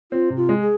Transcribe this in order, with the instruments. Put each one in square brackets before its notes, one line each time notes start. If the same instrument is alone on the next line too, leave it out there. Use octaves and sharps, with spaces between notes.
[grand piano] C4 [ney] F4
[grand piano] C3
[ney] F4
[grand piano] G#3
[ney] G#4